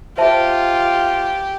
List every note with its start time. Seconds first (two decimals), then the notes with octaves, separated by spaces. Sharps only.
0.18 F4 G4 C5 E5 A5